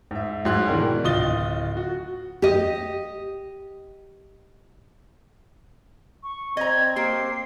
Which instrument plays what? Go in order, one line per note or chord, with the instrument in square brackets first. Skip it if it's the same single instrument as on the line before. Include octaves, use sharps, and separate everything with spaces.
[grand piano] G#2 E5
G#2 F#3 G#4 C6 F#6
B2 D#3 E3 D4 G4 A#4
D1 F4 D#5 D#6 A6 G7
F#4
[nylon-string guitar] G4 D#5
[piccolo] C#6
[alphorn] C4 [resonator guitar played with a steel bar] D#5 A#5 [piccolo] G#6
[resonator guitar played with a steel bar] A#3 G4 [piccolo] C7